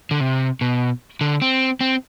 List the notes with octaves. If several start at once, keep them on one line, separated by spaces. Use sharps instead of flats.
D3
C3
B2
D3
C4
C4